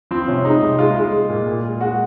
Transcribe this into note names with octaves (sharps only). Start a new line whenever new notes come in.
F3 C4
C3 C#4
G#3 D#4
C3
G#3 F4
G#3
G#3
A#2
A#2
G#3
G#3 F#4